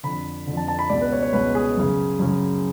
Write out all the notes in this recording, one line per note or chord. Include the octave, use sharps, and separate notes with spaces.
F2 D3 B5
F2 D3
A5
A5
B5
C#2 B2 D5
B4
C#5
C#5
C#2 B2 B4
G#4
F#2 C#3
F#2 C#3